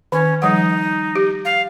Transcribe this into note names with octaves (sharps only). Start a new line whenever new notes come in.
D#3 C#4
F3 G3 D#4 F#5
G4
F5